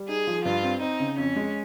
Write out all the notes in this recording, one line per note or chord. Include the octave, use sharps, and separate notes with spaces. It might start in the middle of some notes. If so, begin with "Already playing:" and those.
Already playing: G3
D#4 G#4
F3
G2 F4
C4
C4 D#4
C#3
F2 C#4
G#3